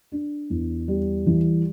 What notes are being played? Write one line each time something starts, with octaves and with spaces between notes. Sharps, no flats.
D4
E2
G3
E3